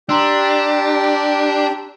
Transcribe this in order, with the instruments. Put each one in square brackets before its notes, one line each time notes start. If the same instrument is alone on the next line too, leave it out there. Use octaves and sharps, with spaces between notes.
[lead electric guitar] D4 [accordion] G4 [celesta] A#5 C6 E6